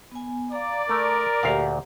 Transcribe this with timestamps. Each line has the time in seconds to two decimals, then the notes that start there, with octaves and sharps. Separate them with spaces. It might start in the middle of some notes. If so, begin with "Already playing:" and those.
0.11 B3 G#5
0.52 D5 F5 A#5
0.89 A3 A#4 A#5 C6 D#6
1.43 D2 A#2 G4 F5 F#5